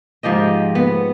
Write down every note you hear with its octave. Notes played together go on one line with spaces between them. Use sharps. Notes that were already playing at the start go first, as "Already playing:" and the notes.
G#2 F3 G4 D#5
B3